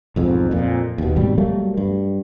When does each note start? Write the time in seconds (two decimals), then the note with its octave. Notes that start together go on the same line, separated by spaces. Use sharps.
0.16 B1 F2 G#2
0.51 F2 A#2
0.98 D#2 B2
1.16 G#1 B2 G3
1.38 F#3 G3 A3 A#3
1.78 G2